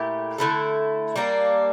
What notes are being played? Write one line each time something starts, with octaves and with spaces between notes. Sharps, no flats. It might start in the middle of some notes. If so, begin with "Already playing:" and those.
Already playing: A#2 A3 E4 G4
D3 A3 E4 A4
G3 A#3 D4